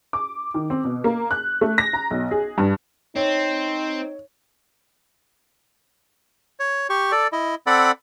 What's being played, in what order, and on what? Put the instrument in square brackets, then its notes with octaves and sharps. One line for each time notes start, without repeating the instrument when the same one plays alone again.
[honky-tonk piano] D6
D#3
C4
B2
A#3
F#6
A3
A#6
A#5
B1
G#4
G2
[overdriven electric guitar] C4 [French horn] D#4 [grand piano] C#5
[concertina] C#5
G4 C#6
A4 D5
E4 D#5
C4 A4 D5 F#5 B5